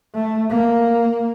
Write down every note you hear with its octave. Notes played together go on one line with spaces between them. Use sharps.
A3
A#3